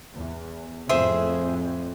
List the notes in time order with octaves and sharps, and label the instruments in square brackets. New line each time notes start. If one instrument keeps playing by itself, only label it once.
[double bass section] E2
[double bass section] F2 A2 [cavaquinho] G#4 C5 E5